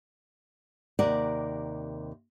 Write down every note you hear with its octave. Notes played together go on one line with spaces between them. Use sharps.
D#2 C3 A#4 D5 F#5